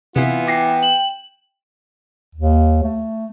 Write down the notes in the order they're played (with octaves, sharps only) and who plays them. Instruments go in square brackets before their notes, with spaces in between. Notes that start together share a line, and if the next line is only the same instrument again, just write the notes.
[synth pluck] C3 [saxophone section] E3 B3 [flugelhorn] F4
[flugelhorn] G5 [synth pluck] D6 A#6 C7
[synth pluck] E7 [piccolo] F#7
[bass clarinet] D#2
A3